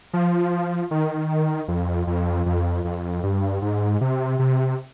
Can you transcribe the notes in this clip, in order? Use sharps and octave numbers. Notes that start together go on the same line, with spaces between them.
F3
D#3
F2
F2
F2
F2
G2
G#2
C3
C3